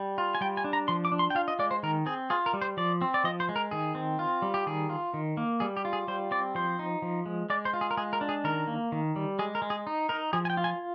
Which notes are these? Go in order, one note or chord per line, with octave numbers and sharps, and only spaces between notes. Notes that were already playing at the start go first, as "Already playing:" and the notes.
Already playing: G3
F4
G#5
G3 G5
G#5
D4
A#5
F3 C6
D6
D4
C6
G5
F4 F5
D#5
G#3 D5
C5
D#3 A#4
C4 G#4
F4 G#4
A#4
G3
C5
F3 D5
C4
D5
F3 D#5
C5
G#3
A#4
D#3 G#4
C4
F4
G3
G4
D#3 G#4
F4
D#3
A#3
G3 G#4
G4
F4
G#4
G3 C5
C4 D5
F3 C5
D#4
F3
G#3
G#3 D5
C5
F4
G#4
A#4
G#3 G#4
A#4
D4
G#4
D#3 A#4
A#3
D#3
G3
G#3 G#4
A#4
G#3
G#4
D#4
D#4 A#4
F3 G#4
G#5
G5
F4
G#5